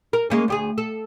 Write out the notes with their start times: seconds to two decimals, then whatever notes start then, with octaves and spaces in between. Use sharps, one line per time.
0.13 A#4
0.30 G#3 A#3 C#4
0.48 D2 G4 G#4
0.78 A4